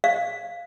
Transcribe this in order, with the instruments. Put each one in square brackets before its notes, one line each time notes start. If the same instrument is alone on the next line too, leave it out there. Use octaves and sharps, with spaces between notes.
[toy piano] F5